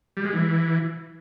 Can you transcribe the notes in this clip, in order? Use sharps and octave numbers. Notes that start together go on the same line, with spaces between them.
G3
G#3
E3